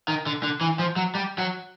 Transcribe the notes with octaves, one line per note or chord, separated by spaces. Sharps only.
D#3
D3
D3
E3
F3
F#3
G3
F#3